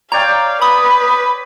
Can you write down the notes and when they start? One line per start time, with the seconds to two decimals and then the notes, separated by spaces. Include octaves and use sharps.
0.12 C#5 D5 F5 G5 A#5
0.61 B4 B5 D#6